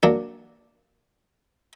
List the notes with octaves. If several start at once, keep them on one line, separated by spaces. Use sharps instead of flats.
F#3 A#3 D4